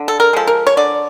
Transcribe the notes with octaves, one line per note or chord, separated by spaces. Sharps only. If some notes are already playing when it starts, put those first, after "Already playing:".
Already playing: D3
A4
A#4
F3 G#3 A4
A#4
C#5
D3 D5